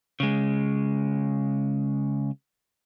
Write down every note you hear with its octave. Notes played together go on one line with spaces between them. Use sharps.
C#3 G#3